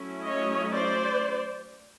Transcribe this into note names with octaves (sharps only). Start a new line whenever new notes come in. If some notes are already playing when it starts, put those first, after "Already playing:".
Already playing: F#3 A3 C#4 E4
C#5 D#5
C5 D5